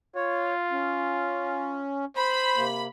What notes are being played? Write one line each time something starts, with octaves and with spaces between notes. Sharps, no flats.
F4 C#5
C#4
C5 B5
C3 A#3